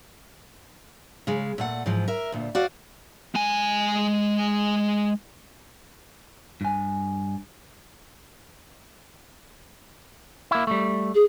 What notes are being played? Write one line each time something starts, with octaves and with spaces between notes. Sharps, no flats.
C#3 G#3
A#2 A3 F#5
G#2 E3 F3
A#4 E5
D2 A#2
F#4 D5 F5
G#3 G#5
G2 G#5
A#3 E4
G3 A3
G#4